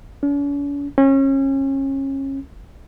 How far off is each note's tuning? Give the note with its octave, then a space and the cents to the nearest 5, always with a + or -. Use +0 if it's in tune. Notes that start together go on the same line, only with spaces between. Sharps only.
C#4 +45
C#4 -30